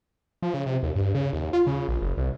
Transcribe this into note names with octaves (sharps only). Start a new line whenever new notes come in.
F3
C#3
C3
D#2
G2
C#3
D#2
F4
C#3
A#1
F#1
C2